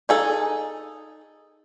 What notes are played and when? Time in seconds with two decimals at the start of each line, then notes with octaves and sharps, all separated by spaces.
0.09 D#4 G#4 A4